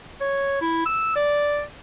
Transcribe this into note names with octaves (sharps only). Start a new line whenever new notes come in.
C#5
E4
E6
D5